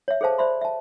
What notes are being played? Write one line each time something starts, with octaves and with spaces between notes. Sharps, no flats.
C#5 E5
G#4 A4 C5 F5 A5
C5 D5 E5 B5 C6
E5 A5